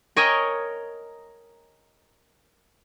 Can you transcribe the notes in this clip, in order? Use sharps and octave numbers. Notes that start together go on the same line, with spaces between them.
A#4 C#5 D#5 G5 G#5 A#5